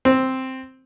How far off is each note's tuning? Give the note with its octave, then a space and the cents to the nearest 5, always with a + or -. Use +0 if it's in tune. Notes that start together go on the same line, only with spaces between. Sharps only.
C4 +0